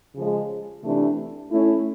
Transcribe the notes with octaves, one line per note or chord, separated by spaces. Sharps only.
C#3 F3 G#3
C3 E3 A3 D4
A3 C#4 E4